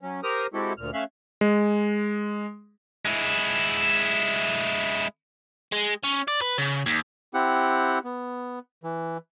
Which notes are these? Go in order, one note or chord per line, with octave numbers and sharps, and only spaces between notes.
F#3 C#4
G4 A#4 C5 A#5 D#6 F6
G#3 C4 E4 F#4 G4 A4
D2 A#2 F6
A3 C#4 E5 F5 F#6
G#3
G#3 E4
G#3
C#4
D5
B4
C#3
D#2
C4 E4 G4 F#5
B3
E3